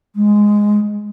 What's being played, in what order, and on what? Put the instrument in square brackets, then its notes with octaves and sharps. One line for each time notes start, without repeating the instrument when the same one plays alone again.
[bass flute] G#3